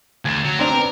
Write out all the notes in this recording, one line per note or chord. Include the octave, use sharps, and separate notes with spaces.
D2 G#6 A6 E7
F#3
C4 D4 A#4 C5
B3